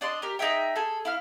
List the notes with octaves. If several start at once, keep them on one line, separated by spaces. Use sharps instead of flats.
D4 D5 D#5 C6
G4 A#4
D#4 G#4 E5 G5
G#4 A4
E4 F5 F6